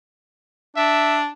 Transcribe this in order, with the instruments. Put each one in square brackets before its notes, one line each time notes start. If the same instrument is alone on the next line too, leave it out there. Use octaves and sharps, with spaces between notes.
[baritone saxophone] D4 [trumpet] E5